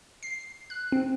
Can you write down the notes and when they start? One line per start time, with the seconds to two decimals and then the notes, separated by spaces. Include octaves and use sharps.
0.23 C7
0.70 F#6
0.92 C4